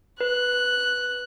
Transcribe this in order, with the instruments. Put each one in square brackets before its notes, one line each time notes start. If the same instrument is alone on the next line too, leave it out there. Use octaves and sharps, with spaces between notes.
[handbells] B4 [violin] F#6